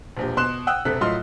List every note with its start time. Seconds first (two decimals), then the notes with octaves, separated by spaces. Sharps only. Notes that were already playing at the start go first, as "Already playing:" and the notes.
0.17 E1 A#1 G4
0.37 B2 C6 F#6 E7
0.67 F#5 G5 D#6 E6 F#6
0.85 E1 C3 A4 F#6 B6
1.01 A2 F#3 F4 D#5 C6 F6